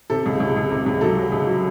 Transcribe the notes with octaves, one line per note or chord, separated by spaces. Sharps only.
C3 A4
C#2
C#2
C#2
C3
C#2
F#3 A4
F#3
C#2
F#3